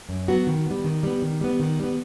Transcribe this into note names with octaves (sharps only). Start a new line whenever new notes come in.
F#2
F#3 B3 F#4
D#3
G3 B3
D#3
G3 B3
D#3
G3 B3
D#3
G3 B3